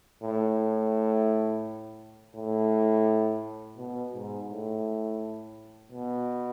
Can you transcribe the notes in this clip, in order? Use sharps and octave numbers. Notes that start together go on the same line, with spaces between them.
A2
A2
B2
G#2
A2
B2